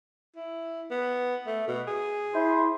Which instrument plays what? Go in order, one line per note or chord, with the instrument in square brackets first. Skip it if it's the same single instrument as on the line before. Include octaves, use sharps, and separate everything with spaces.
[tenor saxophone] E4
B3
A3
B2
G#4
[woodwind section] E4 C5